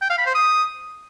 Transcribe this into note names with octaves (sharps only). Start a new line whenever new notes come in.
G5
F5
B5
C5
D#6